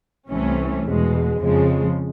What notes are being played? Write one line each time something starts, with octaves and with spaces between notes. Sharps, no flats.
C2 C3 E3 A3 C#4
E2 B2 G#3
F2 C#3 F3 G#3